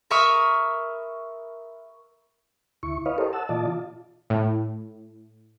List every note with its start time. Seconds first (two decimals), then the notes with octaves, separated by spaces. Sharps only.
0.10 A#4 E5 B5 C#6 D#6 F6
2.83 D2 E4 C#6
3.06 E4 B4 C#5 D#5 F5
3.18 G4 A4 A#4 C5 C#5 D#5
3.33 F#5 A5 E6
3.49 A#2 E3 F4 D5 D#5 A5
3.68 F4
4.30 A2